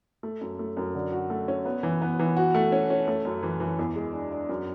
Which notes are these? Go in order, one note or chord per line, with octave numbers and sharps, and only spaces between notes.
A3
F#2
A3
F#2
D3
F#4
A3
C#4
B3
E3
B3
E3
F#4
A3
C#4
C#4
A3
F#2
E3
E3
E2
G#3
D4
D4
F#2